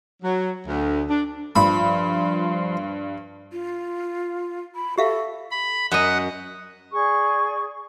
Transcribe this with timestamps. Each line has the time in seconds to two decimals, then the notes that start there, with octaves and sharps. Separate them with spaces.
0.23 F#3
0.67 D2
1.09 D4
1.56 G2 F3 B5 C6
3.52 F4
4.75 B5
4.98 G4 A4 E5 F5
5.51 B5
5.92 F#2 D#5 F#5
6.91 G#4 D5 C#6